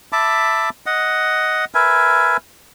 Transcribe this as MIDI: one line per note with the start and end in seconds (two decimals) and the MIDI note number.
0.12 0.70 76
0.12 0.70 81
0.12 0.70 83
0.12 0.70 86
0.86 1.65 75
0.86 1.65 78
1.75 2.37 70
1.75 2.37 71
1.75 2.37 76
1.75 2.37 80